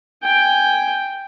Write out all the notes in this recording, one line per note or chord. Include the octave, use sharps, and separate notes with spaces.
G5 G#5